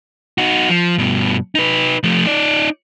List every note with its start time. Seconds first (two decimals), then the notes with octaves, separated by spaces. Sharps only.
0.38 D#4 F#4
0.69 F3
0.98 G2 B2
1.55 D#4 B4
2.04 F3 A3
2.26 D#4 D5